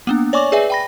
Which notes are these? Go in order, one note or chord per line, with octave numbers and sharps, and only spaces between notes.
A#3 B3 D4
C#5 D5 G#5 C#6 D6
G#4 B4 D5 E5 G#5
G5 B5 A#6